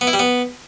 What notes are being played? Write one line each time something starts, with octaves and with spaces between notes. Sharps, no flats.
B3
E4
G3
B3